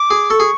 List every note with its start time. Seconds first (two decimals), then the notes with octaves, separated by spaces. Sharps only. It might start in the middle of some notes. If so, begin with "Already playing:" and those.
Already playing: D6
0.11 G#4
0.30 A4 C#6
0.40 G#4